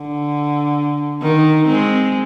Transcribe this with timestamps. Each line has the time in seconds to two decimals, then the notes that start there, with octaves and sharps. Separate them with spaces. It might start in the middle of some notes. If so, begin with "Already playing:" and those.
Already playing: D3
1.22 D#3
1.67 G#3 C4